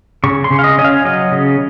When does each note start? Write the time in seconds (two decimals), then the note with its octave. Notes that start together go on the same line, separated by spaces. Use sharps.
0.24 C#3 C#6
0.44 C6
0.51 C#3
0.59 F5
0.64 D#5
0.78 C#4 D#5
0.84 F5
1.05 F#3 D#5
1.32 C#3